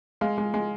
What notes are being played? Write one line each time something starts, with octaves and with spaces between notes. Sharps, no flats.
G#3 F5
G#3
G#3